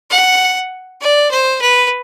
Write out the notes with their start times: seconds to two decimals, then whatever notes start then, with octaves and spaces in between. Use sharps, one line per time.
0.11 F#5
1.01 D5
1.31 C5
1.61 B4